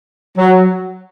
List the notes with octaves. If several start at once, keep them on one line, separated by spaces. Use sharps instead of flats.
F#3